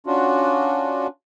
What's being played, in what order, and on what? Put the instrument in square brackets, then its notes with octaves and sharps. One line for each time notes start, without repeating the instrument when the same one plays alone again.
[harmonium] C#4 D4 F4 F#4